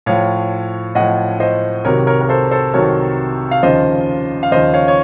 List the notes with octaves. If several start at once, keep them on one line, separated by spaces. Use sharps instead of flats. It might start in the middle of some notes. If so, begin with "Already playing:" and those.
A2 F3 C#5 F5
A2 F3 D#5 F#5
C5 D#5
C2 C3 D#3 F#3 A#4 C#5
A#4 C#5
A#4
A4 C5
A4 C5
C2 C3 D#3 F#3 A#4 C#5
F5
D#2 C#3 F3 C5 D#5
F5
D#2 C#3 F3 C5 D#5
C#5 F5
C#5